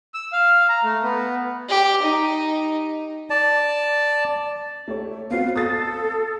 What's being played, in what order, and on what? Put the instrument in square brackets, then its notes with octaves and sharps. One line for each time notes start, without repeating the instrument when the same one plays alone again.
[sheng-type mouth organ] E6
F5
A#5
A3
B3
[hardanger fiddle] G4
D#4
[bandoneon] D5 A5
[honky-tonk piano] A3 G4 C#5
[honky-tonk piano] B3 C4 F#4 [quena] F5
[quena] A4 [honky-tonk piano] D#6 A6